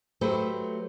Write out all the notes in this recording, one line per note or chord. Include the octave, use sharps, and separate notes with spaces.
F#3 A3 G4 B4 C5